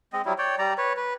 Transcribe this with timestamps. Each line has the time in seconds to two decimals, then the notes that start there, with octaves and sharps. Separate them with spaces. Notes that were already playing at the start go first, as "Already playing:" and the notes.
0.13 G#3 C4 D#5
0.25 F#3 G3 E4
0.38 C#5 D5 G5
0.59 G3 D5 A#5
0.78 B4 C#5
0.97 B4